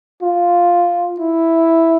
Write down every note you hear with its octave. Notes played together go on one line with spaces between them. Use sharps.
F4
E4